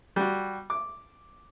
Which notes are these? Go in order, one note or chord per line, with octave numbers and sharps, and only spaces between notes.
G3 F#4
D6